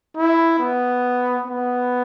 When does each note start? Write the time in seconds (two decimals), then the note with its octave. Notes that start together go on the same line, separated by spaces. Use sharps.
0.17 E4
0.59 B3
1.46 B3